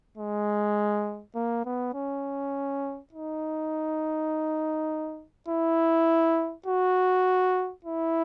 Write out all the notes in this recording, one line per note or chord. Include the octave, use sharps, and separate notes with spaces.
G#3
A#3
B3
C#4
D#4
E4
F#4
E4